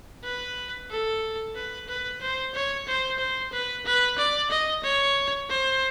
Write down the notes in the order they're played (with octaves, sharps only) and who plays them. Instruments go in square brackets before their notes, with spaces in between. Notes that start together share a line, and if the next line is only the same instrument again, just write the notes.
[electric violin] B4
A4
B4
B4
C5
C#5
C5
C5
B4
B4
D5
D#5
C#5
C5